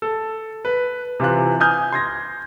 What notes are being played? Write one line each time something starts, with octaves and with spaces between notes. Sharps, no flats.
A4
B4
C3 E3 F4 F#6
G#5 D#6 F6 G6
C6 G#6 A#6